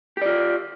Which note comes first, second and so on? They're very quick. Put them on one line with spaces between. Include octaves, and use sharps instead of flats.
G4 D5 F4